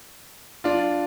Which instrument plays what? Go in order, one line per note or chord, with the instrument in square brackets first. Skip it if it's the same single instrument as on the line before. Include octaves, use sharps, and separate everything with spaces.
[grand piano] D4 F4